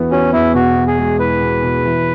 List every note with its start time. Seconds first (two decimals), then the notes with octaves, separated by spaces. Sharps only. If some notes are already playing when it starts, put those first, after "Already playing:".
Already playing: E2 E3 B3 F#4
0.11 C#4 F#4
0.33 E2 E4
0.54 B2 F#4
0.76 B2
0.87 G#4
0.98 G#3
1.19 E4 B4
1.41 B2
1.63 B2
1.84 E3